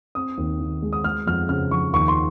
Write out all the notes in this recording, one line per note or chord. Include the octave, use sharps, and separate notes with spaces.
C4 D#6
D#2
D#3
G#3
D#6
G#3 F6
F2 F6
C#3 F6
F3 C#6
D#2 C#6
C6